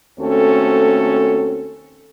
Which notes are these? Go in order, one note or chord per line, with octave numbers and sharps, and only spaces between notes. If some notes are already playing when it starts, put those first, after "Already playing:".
D#2 A3 C4 C#4 F#4 A4